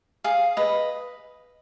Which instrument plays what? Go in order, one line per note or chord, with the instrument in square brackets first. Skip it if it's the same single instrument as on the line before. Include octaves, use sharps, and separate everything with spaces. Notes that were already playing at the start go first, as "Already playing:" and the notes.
[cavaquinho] G#4 F5
B4 D#5